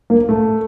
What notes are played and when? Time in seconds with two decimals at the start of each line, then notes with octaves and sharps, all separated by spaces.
0.10 A#3
0.29 A3